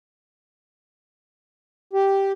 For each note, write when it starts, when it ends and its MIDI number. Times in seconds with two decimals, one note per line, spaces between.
1.93 2.32 67